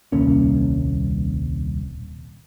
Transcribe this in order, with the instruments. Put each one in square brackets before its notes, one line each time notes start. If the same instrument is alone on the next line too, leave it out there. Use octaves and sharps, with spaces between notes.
[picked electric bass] D#1 C2 A#3 C#4